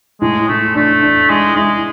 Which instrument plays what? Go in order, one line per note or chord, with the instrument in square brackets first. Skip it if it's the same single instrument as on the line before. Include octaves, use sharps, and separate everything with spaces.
[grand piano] A2 [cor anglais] G#3
[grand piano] A2 [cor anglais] A3
[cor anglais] A3 [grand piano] D4
[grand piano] D4
[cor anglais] G#3 [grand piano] E4
[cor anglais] G#3 [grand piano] E4